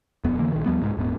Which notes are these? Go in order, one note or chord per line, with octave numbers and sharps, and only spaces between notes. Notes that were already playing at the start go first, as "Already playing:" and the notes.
D#1 F2 B3
F2 D3 E3 A#3
A#1 D#3
D#2 F3 G3 B3
C2 G#2 G#3
D#1 G#2 B3